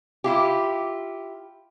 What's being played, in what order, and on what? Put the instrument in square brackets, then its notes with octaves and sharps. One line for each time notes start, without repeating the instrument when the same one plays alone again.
[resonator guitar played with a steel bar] E4 F4 G4